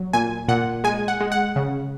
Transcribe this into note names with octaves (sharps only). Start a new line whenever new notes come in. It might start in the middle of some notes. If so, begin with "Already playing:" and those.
Already playing: F#3
A#2 G#5
A#2 F#5
G#3 G#5
F#5
G#3
F#5
C#3